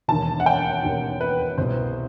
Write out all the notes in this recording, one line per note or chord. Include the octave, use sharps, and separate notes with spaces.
E1 D#2 D#3 A5
F#5
G5
E1 D#2 D#3
B4
C2 B2 C5